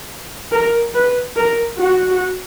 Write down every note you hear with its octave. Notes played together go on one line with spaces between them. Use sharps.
A#4
B4
A#4
F#4